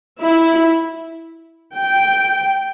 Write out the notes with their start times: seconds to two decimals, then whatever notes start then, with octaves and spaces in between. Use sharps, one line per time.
0.21 E4
1.76 G5